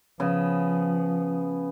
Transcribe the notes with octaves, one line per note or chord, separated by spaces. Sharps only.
C#3 F3 B3